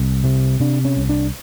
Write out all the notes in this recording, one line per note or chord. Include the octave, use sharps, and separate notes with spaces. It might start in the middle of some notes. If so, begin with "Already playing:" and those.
Already playing: C2
C3
C3 D4
C#4
C2
D4